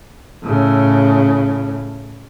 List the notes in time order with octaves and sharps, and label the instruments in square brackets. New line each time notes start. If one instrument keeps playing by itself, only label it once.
[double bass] A2 C#3